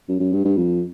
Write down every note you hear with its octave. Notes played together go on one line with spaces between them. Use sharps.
F#2
F#2
G2
G2
F2